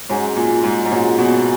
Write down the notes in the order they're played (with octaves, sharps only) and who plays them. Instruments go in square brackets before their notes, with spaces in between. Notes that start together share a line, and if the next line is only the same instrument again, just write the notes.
[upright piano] G#2 [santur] F#3 C#4 G#4 C#5
[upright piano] A#2
G#2
G#2
[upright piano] A#2 [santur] F#3 C#4 G#4 C#5
[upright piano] B2